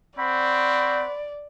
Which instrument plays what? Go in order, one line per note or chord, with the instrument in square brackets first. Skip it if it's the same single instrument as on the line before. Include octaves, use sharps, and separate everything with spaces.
[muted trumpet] C4 [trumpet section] C5 F#5 C#6 [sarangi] D5 [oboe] B5